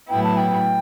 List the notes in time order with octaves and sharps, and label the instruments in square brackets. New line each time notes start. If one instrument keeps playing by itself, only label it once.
[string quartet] A2 F#3 B3 E4 [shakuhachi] G5
[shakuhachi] A5
G5